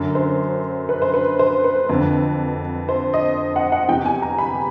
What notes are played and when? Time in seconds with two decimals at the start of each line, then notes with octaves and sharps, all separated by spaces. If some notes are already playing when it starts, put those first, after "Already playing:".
Already playing: F#2 D3
0.15 C5
0.89 B4
1.02 C5
1.14 B4
1.39 C5
1.64 B4
1.89 F2 D3
2.89 C5
3.14 D#5
3.56 F#5
3.72 F#5
3.88 E2 C3 E3 G5
4.06 G#5
4.22 A#5
4.38 B5